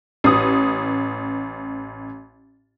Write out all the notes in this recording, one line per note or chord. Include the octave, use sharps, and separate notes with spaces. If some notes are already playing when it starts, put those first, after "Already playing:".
A1 D#6